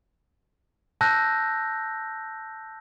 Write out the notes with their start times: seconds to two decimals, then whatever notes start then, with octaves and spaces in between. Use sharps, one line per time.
1.01 A5 E6 F#6 G6 A#6